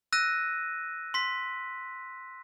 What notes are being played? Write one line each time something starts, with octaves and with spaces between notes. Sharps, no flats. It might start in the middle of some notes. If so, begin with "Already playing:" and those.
E6 F#6 A#6 D#7
C6 B6